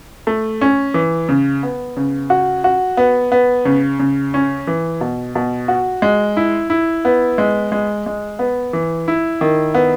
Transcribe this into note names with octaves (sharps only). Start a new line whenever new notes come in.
A3
C#4
E3
C#3
B3
C#3
F#4
F#4
B3
B3
C#3
C#3
C#4
E3
B2
B2
F#4
G#3
E4
E4
B3
G#3
G#3
G#3
B3
E3
E4
D#3
B3